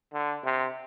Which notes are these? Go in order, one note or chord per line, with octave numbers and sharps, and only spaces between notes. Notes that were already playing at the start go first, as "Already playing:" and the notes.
D3
C3